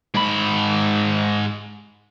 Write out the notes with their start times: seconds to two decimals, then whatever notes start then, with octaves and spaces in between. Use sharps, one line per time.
0.14 G#2 B5